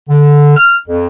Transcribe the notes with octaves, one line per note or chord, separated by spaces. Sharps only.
D3
F6
F2